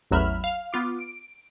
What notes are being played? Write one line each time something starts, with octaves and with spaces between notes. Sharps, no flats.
A1 E2 F#3 E5 B5 F6
F5
B3 F4 D6
D7